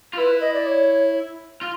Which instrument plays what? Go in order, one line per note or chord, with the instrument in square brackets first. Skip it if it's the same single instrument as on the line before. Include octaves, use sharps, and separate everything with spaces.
[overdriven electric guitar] F4
[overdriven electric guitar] E4 [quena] B4
[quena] D#5
D5
C#5
[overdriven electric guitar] F4